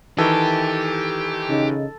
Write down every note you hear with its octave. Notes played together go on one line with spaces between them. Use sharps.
D#3 E3 G4 A4
C#3 D#4